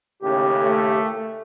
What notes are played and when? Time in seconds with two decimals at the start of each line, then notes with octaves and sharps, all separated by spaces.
0.22 D#2 A2 C#3 G4
0.62 A3